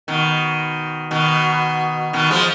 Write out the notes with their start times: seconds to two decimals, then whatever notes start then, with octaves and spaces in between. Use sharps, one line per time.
0.08 B2 D#3
1.11 B2 D#3
2.13 B2 D#3
2.31 F3 G#3